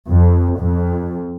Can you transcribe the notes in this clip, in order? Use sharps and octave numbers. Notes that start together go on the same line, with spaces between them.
F2
F2